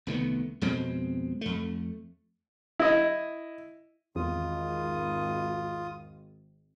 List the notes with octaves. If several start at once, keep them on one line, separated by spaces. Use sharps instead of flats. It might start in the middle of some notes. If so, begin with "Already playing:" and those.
C2 D#3 A3 B3
F2 B2 G#3 C4
F2 A3
E4 D#5
G#1 E2 F4 D#6